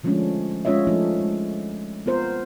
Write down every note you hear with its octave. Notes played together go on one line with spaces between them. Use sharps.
D3 F3 G#3 A3 C#4 D4
G#3 C#4 F4 C#5 D#5 E5
F3 A3 D4 D#4
G#3
B3 F4 A#4 C5